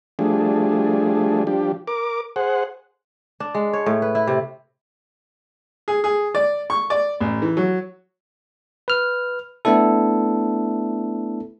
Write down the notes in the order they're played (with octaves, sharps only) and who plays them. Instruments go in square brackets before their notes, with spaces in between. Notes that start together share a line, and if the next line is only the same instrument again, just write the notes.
[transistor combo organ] F3 G3 A3 D4 G#4
F3 G3 D4 G4
A#4 D6
G#4 C5 F#5
[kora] D4
G#3
C#5
A2
B4
E4
C3
[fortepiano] G#4
G#4
D5
C#6
D5
A1
E3
F#3
[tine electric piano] B4 F6
A3 B3 D4 E4 A4